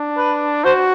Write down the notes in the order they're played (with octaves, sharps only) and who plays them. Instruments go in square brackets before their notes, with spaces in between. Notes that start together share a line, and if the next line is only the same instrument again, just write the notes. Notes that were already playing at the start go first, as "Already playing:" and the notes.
Already playing: [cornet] D4
[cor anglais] B4
[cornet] F#4 [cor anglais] C5